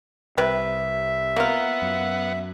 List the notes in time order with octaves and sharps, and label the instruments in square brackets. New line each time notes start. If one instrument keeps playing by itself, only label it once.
[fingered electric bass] C2 [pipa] C3 B4 [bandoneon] E5
[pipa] A#3 F4 [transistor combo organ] B3 F#5
[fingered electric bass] F#2